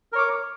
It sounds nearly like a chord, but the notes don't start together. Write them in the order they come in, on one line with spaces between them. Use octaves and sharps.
A#4 C#5 D6